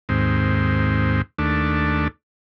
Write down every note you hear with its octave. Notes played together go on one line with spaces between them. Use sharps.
D#2 G#2 C4
D#2 A3 D4